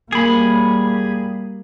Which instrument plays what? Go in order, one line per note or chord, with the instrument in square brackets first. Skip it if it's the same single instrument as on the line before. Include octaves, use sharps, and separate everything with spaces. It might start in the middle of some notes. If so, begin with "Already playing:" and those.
[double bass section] G3 A#3 [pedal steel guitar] G#4 B5